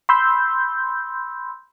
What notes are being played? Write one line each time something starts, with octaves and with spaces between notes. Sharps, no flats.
B5 C6 E6 G6